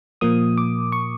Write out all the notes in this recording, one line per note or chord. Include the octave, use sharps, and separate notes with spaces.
A#2 F3 A#3 D#6
D6
C#6